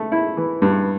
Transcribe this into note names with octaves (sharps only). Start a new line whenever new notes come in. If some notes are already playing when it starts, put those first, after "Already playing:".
Already playing: A3
E4
E3
G2